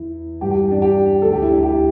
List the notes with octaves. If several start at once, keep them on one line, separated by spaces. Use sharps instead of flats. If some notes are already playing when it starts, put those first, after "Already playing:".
Already playing: E2 E3 E4
G2 E3 G4
G4
D4
G4
D2 D3 A4
G4
E4
E4
G4